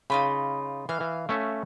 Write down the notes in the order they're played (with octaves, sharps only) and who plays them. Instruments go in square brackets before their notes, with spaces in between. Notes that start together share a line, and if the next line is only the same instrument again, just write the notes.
[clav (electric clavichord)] C#3 [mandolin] D#4 F4 B5
[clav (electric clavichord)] E3 [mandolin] F5
[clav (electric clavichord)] E3
A3 C#4 E5